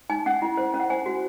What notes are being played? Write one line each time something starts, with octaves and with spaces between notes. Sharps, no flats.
D#4 G#5
C#4 F#5
E4
C5
C#4
F#5
C5 G#5
F#4